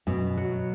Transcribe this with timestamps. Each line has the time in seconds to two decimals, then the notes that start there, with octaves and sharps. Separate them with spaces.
0.07 F#2 B2
0.38 F#3